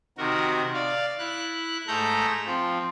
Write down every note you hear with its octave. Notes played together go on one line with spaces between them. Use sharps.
C3 D#3 F#4 A#4
D5 F5
E4 F#6
G#2 A3 A4 A#5 G6
F3 C4